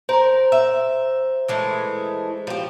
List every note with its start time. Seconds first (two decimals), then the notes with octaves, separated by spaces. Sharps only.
0.09 A#4 C5 A#5
0.52 E5
1.48 E3 G#3 A3
2.47 F3 G4